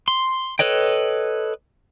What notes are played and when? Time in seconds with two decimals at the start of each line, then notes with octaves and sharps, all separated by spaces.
0.08 C6
0.59 A4 B4 C#5 D#5 G5